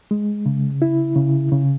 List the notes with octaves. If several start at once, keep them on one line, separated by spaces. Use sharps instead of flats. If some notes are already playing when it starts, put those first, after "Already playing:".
G#3
C#3
E4
C#3
C#3